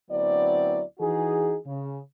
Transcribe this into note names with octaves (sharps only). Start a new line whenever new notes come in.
D2 F#3 B3 C4 E4 D5
E3 D#4 F#4 G#4
C#3